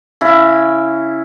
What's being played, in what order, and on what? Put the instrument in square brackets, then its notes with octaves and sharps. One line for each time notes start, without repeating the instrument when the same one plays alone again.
[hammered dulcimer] C#3 E4